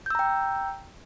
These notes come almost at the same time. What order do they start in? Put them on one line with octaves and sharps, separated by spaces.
G6 E6 A#5 G5